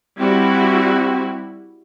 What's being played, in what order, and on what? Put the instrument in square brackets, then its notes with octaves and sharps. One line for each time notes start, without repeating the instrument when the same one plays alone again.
[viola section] G3 E4 F#4 [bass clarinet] C4